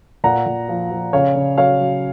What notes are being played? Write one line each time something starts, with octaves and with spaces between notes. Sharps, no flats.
A#2 F#5 A#5
A#2
F3
F3
C#3 C#5 F5
C#3
F#3 C#5 F5
F#3